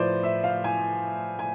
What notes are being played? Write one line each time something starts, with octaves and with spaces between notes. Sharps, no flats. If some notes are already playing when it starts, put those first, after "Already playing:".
Already playing: A2 F3 B4 C5 D5
E5
F5
G#5
G#5